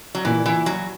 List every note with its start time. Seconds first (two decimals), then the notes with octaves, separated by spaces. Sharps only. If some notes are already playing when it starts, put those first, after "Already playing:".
0.15 F#3
0.25 A#2 E3
0.46 E3
0.66 F#3